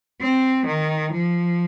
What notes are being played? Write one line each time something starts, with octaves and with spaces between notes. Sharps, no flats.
C4
D#3
F3